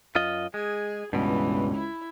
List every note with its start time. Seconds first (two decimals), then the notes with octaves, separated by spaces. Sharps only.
0.15 F#2 F4 D#5
0.54 G#3 G#4
1.13 C#2 G2 B2 E3
1.74 E4